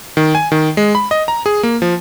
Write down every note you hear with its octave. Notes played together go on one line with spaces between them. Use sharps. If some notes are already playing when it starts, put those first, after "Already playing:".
D#3
G#5
D#3
G#3
B5
D#5
A#5
G#4
A#3
F3